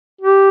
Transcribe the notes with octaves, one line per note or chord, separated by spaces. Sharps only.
G4